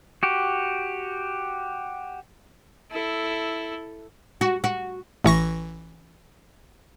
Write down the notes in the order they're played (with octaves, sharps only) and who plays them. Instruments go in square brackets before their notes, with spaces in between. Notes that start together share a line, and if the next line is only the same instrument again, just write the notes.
[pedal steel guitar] F#4 G4
[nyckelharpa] E4 A4
[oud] F#4
F#4
[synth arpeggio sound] A1 E3 C#6 A#6